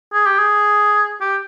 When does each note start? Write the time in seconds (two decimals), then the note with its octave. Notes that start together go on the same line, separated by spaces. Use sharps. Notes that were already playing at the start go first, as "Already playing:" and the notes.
0.13 G#4
0.26 G4
0.39 G#4
1.21 G4